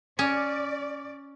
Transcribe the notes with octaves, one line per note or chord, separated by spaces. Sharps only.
C#4 D5